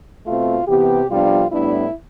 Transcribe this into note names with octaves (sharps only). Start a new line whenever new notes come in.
B2 A3 C4 F4
C3 E3 B3 G4
F2 C3 G3 B3 D4 F4
A2 G3 B3 D4 E4